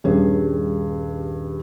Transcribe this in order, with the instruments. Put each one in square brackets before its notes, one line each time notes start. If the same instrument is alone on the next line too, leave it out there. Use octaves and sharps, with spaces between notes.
[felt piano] D#1 G2 C#4 G#4